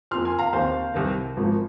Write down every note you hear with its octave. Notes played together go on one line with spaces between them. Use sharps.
F2 F3 A#3 C6 F6
G#5 C6
F5 A#5
D#2 D#3 C4 C5 F5
C2 C3 D#3
G#1 G#2 F3 A#3